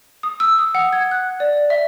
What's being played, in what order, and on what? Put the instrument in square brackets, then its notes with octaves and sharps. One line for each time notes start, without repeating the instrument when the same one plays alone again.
[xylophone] D#6
E6
D#6
F#5
G#6
F#6
D5
E5